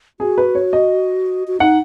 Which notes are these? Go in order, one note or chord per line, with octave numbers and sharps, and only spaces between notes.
F#4 G#4
B4
C#5
D#5
F#4
D#4 F#5